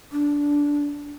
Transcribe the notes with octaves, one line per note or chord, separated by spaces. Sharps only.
D4